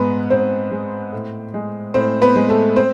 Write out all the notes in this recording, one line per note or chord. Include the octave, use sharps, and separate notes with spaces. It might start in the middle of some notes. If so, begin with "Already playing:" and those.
Already playing: G#2 G#3 B3 B4
G#2 C4 C5
G#3
A2
G#3
A2 C4 C5
B3 B4
G#3
A3 A4
C4 C5